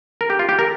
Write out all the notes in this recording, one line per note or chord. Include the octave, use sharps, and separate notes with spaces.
A#4
G4
F4
G4
A#4